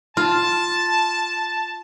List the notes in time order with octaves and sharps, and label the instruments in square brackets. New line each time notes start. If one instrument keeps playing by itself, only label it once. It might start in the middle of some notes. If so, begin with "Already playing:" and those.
[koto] F4 [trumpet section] A5